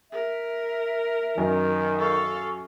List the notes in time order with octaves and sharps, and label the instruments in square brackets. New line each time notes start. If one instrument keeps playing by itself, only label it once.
[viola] A#4 [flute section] E5
[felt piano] F#2 [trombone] D#3
[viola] A4 F5 [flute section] C#6